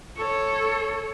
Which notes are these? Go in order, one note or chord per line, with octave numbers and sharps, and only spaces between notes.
A4 C#5